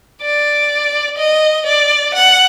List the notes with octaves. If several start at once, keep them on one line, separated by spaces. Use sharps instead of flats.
D5
D#5
D5
F#5